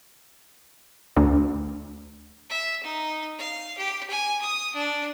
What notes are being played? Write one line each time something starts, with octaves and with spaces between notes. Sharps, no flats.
D2
E5
D#4
F5
G4
G#5
D#6
D4